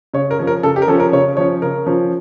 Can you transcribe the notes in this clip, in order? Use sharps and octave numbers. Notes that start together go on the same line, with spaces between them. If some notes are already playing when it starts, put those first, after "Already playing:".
C#3 C#5
A#4
F3 C#4
A#4
C#3 A4
G4
A#4
F3 C#4 A4
A#4
C#3 C#5
F3 C#4 C#5
C#3 A#4
F3 C#4